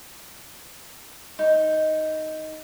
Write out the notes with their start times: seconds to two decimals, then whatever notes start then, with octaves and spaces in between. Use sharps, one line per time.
1.39 D#4